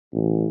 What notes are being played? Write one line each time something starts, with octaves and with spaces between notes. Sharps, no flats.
A1